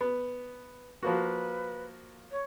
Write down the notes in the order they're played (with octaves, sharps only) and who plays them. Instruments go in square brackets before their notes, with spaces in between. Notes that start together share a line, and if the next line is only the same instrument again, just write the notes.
[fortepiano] B3
[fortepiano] F3 A#3 F#4 [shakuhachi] B4
[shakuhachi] C#5